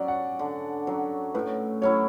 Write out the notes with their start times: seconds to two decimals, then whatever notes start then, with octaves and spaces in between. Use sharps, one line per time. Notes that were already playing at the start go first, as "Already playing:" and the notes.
Already playing: F#3 C#4 D5
0.08 F#5
0.39 D3
0.87 F#3 C#4
1.34 A2 B4
1.82 F#3 C#4 E4 C#5